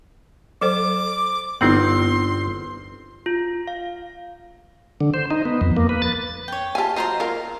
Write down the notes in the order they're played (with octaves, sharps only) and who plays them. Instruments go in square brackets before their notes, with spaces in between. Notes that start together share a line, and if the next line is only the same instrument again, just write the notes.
[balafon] F#3 A4 C5 [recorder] D6
[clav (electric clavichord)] G1 C4 F#5 [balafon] B3 D#4 E4 [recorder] C6
[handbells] F4
F5
[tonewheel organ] D3
C5
D#4
B3
F2
A#3
B4
A6
[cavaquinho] C#5 G5
[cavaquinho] F4 A5 [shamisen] G4 G#5
[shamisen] F#3 F4 D#5 [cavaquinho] C5 A#5 C6
[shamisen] C#3 A#4 [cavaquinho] F4